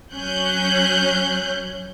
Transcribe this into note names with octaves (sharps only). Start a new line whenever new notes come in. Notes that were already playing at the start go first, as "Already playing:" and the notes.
F#3 C#4 C#5 F#6 G6